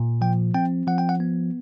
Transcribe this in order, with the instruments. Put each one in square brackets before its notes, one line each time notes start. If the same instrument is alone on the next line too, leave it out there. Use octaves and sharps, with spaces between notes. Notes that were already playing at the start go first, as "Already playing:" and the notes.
Already playing: [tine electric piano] A#2
F3 G5
C4 G5
F3 F#5
G5
F#5
B3